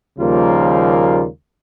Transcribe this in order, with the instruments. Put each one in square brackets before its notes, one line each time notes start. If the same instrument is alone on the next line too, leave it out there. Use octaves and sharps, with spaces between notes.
[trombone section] D#2 C#3 F3 G3 A#3 F4